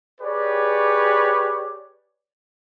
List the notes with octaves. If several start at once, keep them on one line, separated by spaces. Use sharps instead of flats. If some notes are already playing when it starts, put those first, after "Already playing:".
G4 G#4 B4 C#5 D5